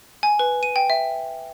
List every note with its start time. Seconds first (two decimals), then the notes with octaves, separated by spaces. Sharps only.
0.23 G#5
0.39 B4
0.63 D#7
0.76 G5
0.90 E5